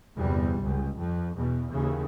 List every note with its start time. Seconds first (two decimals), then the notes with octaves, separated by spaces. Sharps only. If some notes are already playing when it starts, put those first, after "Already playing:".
0.15 G1 E2 C3 G3
0.62 C#2
0.97 F2
1.35 E2 B2
1.69 D#2 C#3 E3